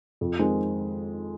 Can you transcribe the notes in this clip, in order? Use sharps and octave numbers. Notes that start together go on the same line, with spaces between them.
F2
D#3 G#3 C4